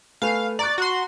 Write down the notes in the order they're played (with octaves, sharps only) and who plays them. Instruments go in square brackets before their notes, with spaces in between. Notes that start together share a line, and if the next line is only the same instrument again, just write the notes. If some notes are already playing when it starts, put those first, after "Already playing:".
[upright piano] A3 B4 G#5 [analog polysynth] F5
[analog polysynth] D5 [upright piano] A#5 C#6 F#6
[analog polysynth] F#4 C6